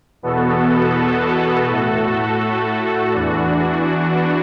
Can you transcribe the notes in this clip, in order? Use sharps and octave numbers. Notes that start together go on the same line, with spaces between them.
E2 B2 B3 F#4 A4
A2 A3 F#4 A4
E2 E3 D4 F#4